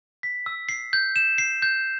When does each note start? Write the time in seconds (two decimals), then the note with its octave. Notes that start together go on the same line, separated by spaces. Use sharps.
0.23 B6
0.46 E6
0.69 C7
0.93 G6
1.16 E7
1.38 C7
1.62 G6